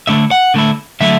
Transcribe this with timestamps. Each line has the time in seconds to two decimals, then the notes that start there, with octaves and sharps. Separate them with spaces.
0.07 D3 A3 E4 E5
0.31 F#5
0.54 D3 A3 E4
1.00 D3 F#3 A3 E4 E5